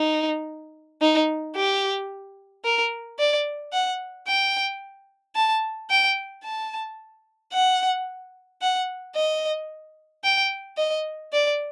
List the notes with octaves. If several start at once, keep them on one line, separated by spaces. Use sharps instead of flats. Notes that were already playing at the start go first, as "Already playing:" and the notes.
Already playing: D#4
D#4
G4
A#4
D5
F#5
G5
A5
G5
A5
F#5
F#5
D#5
G5
D#5
D5